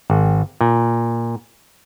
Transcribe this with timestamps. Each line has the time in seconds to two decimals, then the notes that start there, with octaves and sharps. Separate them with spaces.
0.10 G#1
0.61 A#2